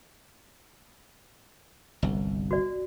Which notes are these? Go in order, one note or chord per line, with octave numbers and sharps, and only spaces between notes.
G1 C2
F#4 D5